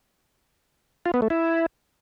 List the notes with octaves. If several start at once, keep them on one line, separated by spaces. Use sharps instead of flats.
F4
B3
A3
E4